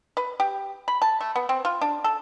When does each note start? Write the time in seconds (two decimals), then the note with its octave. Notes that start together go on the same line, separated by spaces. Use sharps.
0.17 B4
0.40 G4
0.88 B5
1.02 A5
1.21 A3
1.36 B3
1.49 C4
1.65 F4
1.81 D4
2.04 A4